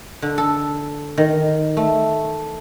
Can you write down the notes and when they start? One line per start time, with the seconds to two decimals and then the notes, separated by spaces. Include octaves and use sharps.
0.22 D3
0.38 A4
1.17 D#3
1.77 A3